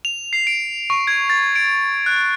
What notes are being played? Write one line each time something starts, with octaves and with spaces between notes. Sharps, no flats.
F7
C7
D7
C#6
G#6
A6
D7
F#6